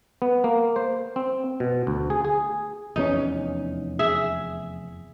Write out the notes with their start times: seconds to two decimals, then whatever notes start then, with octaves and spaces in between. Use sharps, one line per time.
0.22 B3
0.44 A#3
0.76 C5
1.16 C4
1.60 B2
1.87 D2
2.10 G#4
2.25 G#4
2.96 F1 E2 C#4 D#4
3.99 G#4 E5